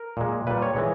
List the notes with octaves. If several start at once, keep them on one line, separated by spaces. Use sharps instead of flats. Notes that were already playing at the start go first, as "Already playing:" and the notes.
Already playing: A#4
A#2 G#3
A#2 G3 B4
C#5
E3 G#3